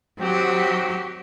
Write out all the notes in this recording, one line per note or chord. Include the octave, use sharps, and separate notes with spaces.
D#3 F#3 C4 F#4 G4